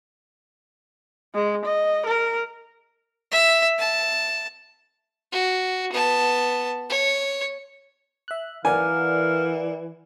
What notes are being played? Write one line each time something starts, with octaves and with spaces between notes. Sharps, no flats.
G#3
D#5
A#4
E5
A5
F#4
B3 A5
C#5
E5 F#6
E3 A#4 D5 F5 F#5 G#5